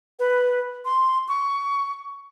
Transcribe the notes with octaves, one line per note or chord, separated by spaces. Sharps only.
B4
C6
C#6